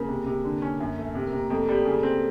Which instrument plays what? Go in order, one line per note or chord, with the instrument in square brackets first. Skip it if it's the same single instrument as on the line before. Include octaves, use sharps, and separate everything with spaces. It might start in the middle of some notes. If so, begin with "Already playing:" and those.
Already playing: [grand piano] C#3 [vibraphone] A#3 A#4
[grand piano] C3
C3
D3
C#4
F#2
A3
C3
[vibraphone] A#3 A#4
[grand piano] C3
[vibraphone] A#3 A#4
[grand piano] F2 [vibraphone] A3 A4
[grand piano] G3
C#3
C4